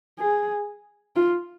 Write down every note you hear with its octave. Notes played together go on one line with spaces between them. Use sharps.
G#4
F4